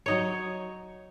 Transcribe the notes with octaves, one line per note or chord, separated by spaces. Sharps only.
F#3 D#4 C#5